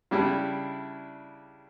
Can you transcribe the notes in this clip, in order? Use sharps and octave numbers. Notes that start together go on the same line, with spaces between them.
C#3 G3 D4 E4